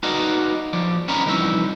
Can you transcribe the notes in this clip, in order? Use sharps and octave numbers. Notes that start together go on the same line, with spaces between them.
D#4 F#4 B4 D5 D#5 F5
F3 D5
B3 C#4 A#4 D#5 A#5 B5
C2 E3 F3 D#4 D#5 E5